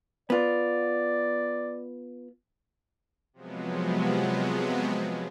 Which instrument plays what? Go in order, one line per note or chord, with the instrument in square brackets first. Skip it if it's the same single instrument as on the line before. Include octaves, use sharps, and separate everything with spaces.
[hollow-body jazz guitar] B3 F4 [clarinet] D5
[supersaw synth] C3 F3 F#3 G#3 B3